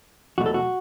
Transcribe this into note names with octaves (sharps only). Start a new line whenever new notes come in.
E2 B2 F#3 A3 F#4
A4
F#4